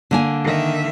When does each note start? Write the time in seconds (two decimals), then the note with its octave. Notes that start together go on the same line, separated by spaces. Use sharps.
0.11 D3 A#3 G#5
0.44 D#3 E5